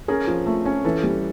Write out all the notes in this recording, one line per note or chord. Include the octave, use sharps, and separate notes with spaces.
C#4 G#4 A#4
F3
A3
C#4
E3 A4 B4
G3